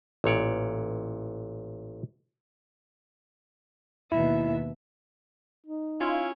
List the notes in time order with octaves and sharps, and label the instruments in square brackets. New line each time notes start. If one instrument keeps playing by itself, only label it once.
[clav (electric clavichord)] A1 A#2 C#5 D5
[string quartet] D#2 B2 E5 [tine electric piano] E4
[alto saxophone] D#4
[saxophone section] C#4 E4 F5 [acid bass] F4